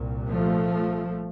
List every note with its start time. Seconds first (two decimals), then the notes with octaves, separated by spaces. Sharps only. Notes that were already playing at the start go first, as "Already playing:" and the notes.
Already playing: C2 A#2
0.28 F3 A3